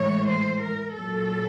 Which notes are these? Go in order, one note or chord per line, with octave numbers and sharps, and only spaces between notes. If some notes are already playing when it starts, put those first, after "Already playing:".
Already playing: A2 E3 G#3 C#5
C5
A#4
A#2 F#3 A4